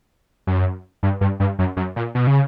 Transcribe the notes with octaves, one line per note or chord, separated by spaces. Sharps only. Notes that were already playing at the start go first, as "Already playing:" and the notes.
F#2
G2
G2
G2
F#2
F#2
A#2
B2
C#3